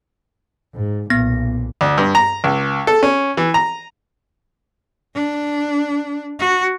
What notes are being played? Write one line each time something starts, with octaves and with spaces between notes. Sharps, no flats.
G#2
B1 A#2 B3 A#6
D2
G2
A#5
C#2
A4
C#4
E3
A#5
D4
F#4